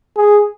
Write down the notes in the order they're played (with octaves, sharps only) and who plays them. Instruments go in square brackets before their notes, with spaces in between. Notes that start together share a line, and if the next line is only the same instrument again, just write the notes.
[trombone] G#4